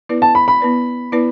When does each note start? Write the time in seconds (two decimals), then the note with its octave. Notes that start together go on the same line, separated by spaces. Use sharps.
0.09 B3 E4 B4 D5
0.22 A5
0.35 B5
0.48 B5
0.61 B3 E4 B4 D5
1.12 B3 E4 B4 D5